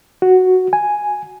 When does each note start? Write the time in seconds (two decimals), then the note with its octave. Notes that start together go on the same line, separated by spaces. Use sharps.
0.22 F#4
0.73 G#5